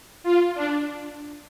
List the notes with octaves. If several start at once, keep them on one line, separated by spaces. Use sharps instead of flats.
F4
D4